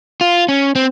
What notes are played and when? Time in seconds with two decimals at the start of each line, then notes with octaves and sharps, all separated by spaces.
0.21 F4
0.48 C#4
0.75 C4